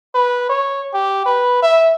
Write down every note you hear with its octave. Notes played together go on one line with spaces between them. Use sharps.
B4
C#5
G4
B4
E5